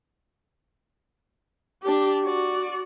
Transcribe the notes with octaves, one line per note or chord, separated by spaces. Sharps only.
D4 G4
F#4 D5